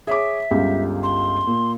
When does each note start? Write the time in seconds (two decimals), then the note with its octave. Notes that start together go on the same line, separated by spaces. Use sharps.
0.07 G#4 C#5 E5 D6
0.51 G1 C#2 G4
1.03 C6
1.47 A#2